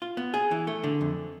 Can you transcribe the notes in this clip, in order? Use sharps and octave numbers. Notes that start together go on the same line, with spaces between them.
F4
B3
G#4
E3
A3
D3
F2